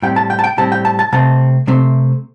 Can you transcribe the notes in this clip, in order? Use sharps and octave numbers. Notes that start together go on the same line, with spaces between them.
A2 G3 C4 G5
A5
G5
A5
G5
A2 G3 C4 A5
G5
A5
A5
C3 A3 C4 A5
C3 A3 C4